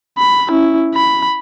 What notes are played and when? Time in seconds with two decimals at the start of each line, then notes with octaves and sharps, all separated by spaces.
0.18 B5
0.50 C#4 E4
0.95 B5